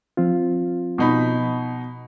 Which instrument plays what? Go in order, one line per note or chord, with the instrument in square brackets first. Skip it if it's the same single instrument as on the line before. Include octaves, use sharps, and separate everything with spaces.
[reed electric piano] F3 C4 F4
[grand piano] B2 D#4 B5